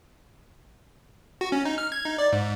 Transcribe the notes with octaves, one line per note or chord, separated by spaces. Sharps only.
F#4
C#4
D#4
F6
G#6
D#4
D5
G#2